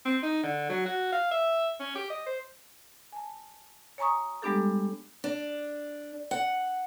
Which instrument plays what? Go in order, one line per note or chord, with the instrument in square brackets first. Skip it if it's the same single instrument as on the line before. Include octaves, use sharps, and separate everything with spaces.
[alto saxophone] C4
D#4
D3
F#3
F#4
F5
E5
C#4
G4
D#5
C5
[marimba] G#5 A5
C#5 G#5 A#5 C#6 D#6
G3 G#3 B3 D4 G4 A4
[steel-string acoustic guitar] D4
F#5